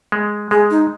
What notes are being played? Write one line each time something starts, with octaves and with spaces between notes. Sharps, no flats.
G#3
G#3 G#4
D#4